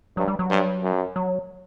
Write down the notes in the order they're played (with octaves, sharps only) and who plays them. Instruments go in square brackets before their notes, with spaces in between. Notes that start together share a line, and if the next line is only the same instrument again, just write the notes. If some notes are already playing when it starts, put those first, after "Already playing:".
[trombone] G2 [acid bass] F#3
[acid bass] G3
F#3
[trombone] G2
F#2
[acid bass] F#3